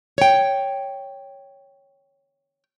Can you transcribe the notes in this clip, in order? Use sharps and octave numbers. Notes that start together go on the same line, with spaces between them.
C#5 G5